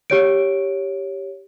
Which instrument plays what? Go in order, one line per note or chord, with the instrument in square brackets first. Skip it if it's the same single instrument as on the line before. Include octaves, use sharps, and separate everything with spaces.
[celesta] G4 C#5 D7